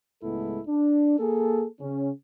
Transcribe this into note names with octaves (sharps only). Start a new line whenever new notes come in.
C#2 A2 G#3 B3 E4 A4
D4
A#3 G#4 A4
C#3 C#4